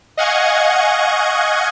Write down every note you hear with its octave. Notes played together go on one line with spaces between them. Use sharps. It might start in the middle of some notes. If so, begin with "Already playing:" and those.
D#5 F5 F#5 G#5 C#6 G#6